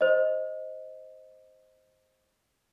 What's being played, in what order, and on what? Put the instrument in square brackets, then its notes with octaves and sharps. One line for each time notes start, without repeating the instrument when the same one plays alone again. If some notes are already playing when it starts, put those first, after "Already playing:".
[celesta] C5 D#5